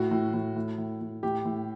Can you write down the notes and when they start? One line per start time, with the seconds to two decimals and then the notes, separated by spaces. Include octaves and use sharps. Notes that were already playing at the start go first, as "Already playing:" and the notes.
Already playing: A2 F#4
0.11 A2
0.34 A2
0.56 A2
0.78 A2
1.01 A2
1.23 A2 G4
1.45 A2